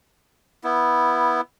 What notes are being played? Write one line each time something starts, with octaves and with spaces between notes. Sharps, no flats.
B3 E4